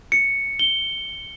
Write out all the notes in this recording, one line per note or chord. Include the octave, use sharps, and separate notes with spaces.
C#7
G7